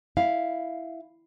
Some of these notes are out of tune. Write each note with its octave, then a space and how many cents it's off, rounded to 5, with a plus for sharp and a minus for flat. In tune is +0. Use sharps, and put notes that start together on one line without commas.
E4 +0 F5 +0